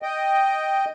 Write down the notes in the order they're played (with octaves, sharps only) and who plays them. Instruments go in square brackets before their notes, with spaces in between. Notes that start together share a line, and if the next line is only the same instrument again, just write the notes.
[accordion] D#5 G5